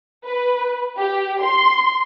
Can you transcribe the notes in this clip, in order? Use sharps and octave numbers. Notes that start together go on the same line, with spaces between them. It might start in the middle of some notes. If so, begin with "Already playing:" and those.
B4
G4
C6